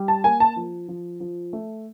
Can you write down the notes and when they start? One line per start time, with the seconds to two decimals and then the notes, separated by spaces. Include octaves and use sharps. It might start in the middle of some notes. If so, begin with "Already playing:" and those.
Already playing: G3
0.08 A5
0.24 A#3 G#5
0.40 A5
0.56 F3
0.88 F3
1.20 F3
1.53 A3